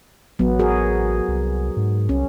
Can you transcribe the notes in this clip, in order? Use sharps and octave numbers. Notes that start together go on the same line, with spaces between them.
A1 F#3 B3
F#4 G#4 A#4
C2
G#2
C2 C#4